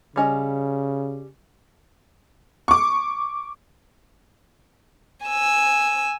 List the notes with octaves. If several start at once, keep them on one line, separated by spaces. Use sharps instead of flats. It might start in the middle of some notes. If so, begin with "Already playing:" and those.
C#3 G3 C#4 D#5
C#6 D6
G#5 E6